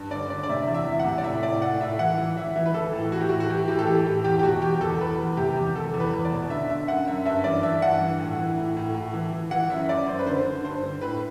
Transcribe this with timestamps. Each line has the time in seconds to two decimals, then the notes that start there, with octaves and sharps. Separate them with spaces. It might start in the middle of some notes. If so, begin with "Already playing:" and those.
Already playing: G2
0.10 D3 D5
0.30 D3 D5
0.43 D5
0.49 C3 E5
0.68 E2
0.74 E5
0.87 E3
0.99 F#5
1.05 C3
1.18 D5
1.24 A2 E5
1.43 A2 D5
1.61 A2 F#5
1.81 A2 E5
1.99 E3 F#5
2.18 E3
2.36 E3 E5
2.56 E3
2.66 B4
2.74 E3 A4
2.93 A2
3.12 E3 F#4
3.20 G4
3.29 A2 F#4
3.40 F#4
3.50 E3 G4
3.68 A2 G4
3.79 A4
3.87 E3 G4
4.06 A2 G4
4.24 E2 G4
4.39 G4
4.43 B2 F#4
4.62 E2 G4
4.81 E2 A4
5.00 E2 B4
5.19 E2
5.37 C3 G4
5.56 E2
5.75 E2 A4
5.94 E2
6.00 B4
6.13 E2
6.25 D5
6.31 B2
6.50 D3 E5
6.70 D3 E5
6.87 F#2 F#5
7.07 F#2 E5
7.25 G2 E5
7.44 E3 D5
7.63 E3 E5
7.82 G2 F#5
8.00 E3
8.19 A2
8.39 E3
8.57 A2
8.77 A2
8.94 A2
9.13 E3
9.33 E3
9.51 E3 F#5
9.70 F#2 E5
9.89 F#2 D5
10.07 F#2 C5
10.19 B4
10.26 D3 C5
10.45 D3
10.64 G2 C5
10.83 D3
11.01 A2 B4